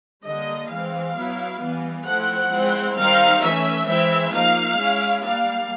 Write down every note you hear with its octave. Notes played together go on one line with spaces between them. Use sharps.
D3 G3 A#3 D#5
E3 G#3 C4 F5
F#3 B3 E4
E3 G3 B3
F3 A3 C4 E4 F#5
G#3 C4 E4
D#3 G3 C4 D#4 F5
E3 A3 C#4 E5
E3 G#3 C4 E4 E5
F3 A#3 D#4 F5
G#3 C#4 E4
G3 A#3 D4 F5